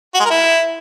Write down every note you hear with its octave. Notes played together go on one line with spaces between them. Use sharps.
F#4
G#3
A#4
E4